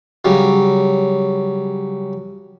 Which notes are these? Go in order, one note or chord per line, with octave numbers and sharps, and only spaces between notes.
C#3 F#3 G3